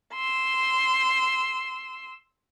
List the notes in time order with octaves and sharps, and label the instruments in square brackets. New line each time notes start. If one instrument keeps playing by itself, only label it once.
[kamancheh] C6 E6